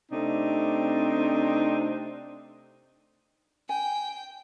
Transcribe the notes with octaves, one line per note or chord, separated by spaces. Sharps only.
C3 A3 C4 D4 D#4
G5 G#5